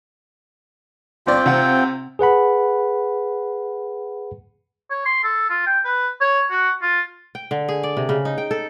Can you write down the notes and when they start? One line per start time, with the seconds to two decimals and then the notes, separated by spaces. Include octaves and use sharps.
1.27 G1 C4 F4 D5 G5
1.46 C3 F#5
2.19 G#4 B4 F#5 B5
4.91 C#5
5.06 C6
5.24 A4
5.50 F4
5.66 G5
5.85 B4
6.21 C#5
6.51 F#4
6.82 F4
7.35 G5
7.51 D3
7.69 G#4
7.83 D5
7.97 C3
8.09 C#3
8.25 D#4
8.38 G5
8.51 A4